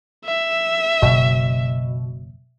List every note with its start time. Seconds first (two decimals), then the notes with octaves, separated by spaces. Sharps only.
0.25 E5
1.02 F#1 B2